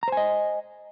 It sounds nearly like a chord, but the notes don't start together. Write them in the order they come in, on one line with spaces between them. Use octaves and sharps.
A#5 C5 G#5 D#5